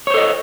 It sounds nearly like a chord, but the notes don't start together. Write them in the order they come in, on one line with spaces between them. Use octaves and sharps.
C#5 C5 A4 D#5